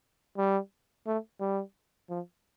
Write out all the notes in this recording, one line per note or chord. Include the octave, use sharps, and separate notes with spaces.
G3
A3
G3
F3